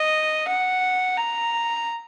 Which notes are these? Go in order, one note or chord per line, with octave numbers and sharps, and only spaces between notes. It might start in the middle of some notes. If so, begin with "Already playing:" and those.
Already playing: D#5
F#5
A#5